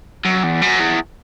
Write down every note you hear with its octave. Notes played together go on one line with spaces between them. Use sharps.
F#2
E2
F#2
E2